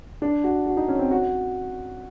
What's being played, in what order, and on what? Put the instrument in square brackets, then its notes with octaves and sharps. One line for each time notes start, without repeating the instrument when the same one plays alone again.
[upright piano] D4
F#4
F#4
D#4
C#4
C4
F#4